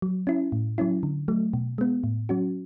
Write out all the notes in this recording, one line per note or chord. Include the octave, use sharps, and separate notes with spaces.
F#3
C#4 E4
A2
F#3 C#4 E4
D3
F#3 A3
B2
G#3 B3
A2
F#3 C#4 F#4